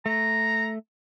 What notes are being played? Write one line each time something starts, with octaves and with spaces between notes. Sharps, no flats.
A3 A#5